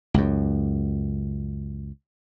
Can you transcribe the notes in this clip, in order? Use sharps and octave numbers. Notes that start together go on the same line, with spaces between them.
C#2 F#2